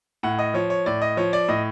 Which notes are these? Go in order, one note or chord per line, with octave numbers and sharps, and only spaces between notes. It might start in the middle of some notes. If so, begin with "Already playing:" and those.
A2 F#5
D#5
F3 C#5
C#5
A2 D5
D#5
F3 C#5
D5
A2 D#5